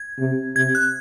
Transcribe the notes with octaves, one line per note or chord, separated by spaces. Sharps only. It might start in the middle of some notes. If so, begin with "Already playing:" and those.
Already playing: G#6
C3
C3 G#6
F#6